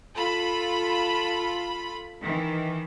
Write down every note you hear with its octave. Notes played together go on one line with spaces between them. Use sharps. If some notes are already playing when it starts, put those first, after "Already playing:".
F4 A4 B5
D#3 E3